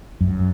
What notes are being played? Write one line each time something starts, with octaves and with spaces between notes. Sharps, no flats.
F#2